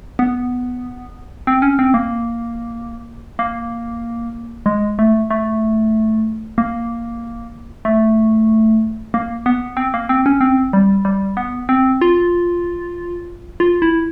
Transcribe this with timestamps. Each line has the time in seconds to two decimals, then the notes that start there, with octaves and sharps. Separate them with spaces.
0.19 B3
1.47 C4
1.62 C#4
1.79 C4
1.94 A#3
3.39 A#3
4.66 G#3
4.99 A3
5.30 A3
6.58 A#3
7.85 A3
9.14 A#3
9.46 B3
9.77 C4
9.94 A#3
10.09 C4
10.26 C#4
10.41 C4
10.73 G3
11.05 G3
11.37 B3
11.69 C4
12.01 F4
13.60 F4
13.82 E4